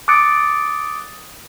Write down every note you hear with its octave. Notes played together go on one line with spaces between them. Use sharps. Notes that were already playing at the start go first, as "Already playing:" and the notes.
D6 D#6 F#6 A6 C#7 D7